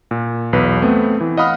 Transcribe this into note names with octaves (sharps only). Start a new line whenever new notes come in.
A#2
B1 E2 B4
A3 B3 C4
E3
D#5 F5 F#5 B5 D#6 F6